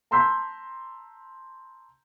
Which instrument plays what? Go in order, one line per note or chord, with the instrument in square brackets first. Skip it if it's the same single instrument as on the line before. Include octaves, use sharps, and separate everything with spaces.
[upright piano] A5 A#5 C6 E6 G6 B6